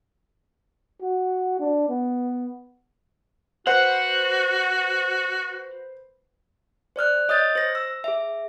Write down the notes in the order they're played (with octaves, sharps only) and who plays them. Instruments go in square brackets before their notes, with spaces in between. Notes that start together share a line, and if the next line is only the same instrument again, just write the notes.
[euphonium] F#4
D4
B3
[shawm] F#4 [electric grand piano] B4 C5 [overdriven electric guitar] F#5
[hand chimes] C5 D5 F6 F#6
C#5 D#5 D#6 F6 G6 A6
C5 A#6
E6
G#4 E5